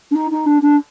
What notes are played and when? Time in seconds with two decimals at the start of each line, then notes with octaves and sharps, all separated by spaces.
0.11 D4
0.15 D#4
0.31 D#4
0.46 D4
0.62 D4